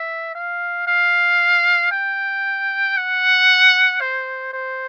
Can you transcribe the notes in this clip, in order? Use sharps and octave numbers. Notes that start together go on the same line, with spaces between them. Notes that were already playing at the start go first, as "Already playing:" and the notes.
Already playing: E5
F5
F5
G5
F#5
C5
C5